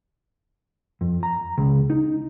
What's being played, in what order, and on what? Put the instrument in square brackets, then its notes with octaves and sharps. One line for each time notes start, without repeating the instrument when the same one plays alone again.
[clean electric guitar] F2
A#5
C#2
D#4